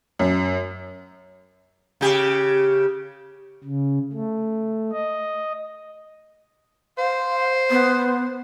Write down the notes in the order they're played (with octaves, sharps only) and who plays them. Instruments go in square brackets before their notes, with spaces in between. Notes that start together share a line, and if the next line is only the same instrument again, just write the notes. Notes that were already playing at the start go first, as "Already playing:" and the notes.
[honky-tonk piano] F#2
[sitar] C#3 G4
[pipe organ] C#3
A3
D#5
[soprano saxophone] C5 [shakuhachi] F5
[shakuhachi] B3